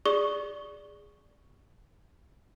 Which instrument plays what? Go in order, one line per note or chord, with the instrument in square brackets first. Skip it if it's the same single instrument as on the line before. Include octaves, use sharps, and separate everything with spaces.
[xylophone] G#4 D5 C#6 D#6 G7